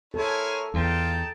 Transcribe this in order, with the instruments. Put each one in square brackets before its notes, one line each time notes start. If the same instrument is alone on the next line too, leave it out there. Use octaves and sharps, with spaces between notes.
[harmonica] E4 A#4 C#5 [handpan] A4 [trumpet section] C5 G#5
[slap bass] E2 [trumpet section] D#4 G5 A5 [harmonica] F4